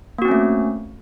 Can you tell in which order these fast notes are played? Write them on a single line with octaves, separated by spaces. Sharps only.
A#3 F#4 C4 C#4 A3